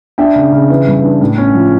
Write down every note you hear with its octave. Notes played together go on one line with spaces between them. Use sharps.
D4 E5 G5
C#3
C#3
E3
G2
D4
A2
C#4
F3